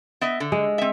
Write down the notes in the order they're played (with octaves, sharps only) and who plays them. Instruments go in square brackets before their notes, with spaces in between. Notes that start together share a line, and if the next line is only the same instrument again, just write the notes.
[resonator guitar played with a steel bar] B3 D#5 E5
D3
[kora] G#3
[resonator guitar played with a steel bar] C4 E5